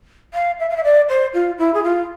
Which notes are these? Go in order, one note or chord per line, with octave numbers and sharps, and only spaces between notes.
F5
E5
F5
E5
D5
C5
F4
E4
G#4
F4